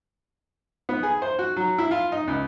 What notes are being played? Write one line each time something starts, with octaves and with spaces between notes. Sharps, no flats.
B3
G#4
C5
F#4
F#3
E4
F4
D#4
C#2